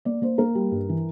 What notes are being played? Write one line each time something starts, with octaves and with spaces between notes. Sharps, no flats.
A#3 D5
A#3 C5
A#3 A#4
G3
G2
E3